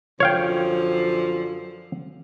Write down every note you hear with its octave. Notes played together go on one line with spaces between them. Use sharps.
F#2 D3 F3 C#5 F5 G5